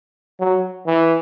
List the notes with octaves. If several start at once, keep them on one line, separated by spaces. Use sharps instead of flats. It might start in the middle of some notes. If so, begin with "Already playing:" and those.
F#3
E3